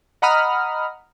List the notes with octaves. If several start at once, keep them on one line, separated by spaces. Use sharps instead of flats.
D#5 F#5 A#5 B5 D#6 F6